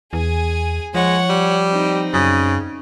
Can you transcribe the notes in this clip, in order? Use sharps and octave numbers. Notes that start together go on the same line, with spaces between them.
E2 G#4 G#5
F3 G#3 C#5 F#5
G3
C4 D#4
F#2 C#3